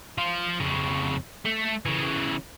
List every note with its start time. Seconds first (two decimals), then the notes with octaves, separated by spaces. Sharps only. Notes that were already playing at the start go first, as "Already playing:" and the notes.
0.18 F3 F4
0.60 F2 C#3
1.45 A3
1.85 C#3 E3